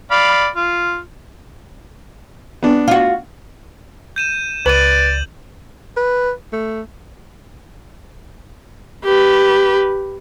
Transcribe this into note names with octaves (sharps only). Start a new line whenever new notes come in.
D5 F5 B5
F4
B3 D4
F4 F#4
G6 D#7 E7
C#2 B4 D5 D#7 F#7
B4
A3
G4 B4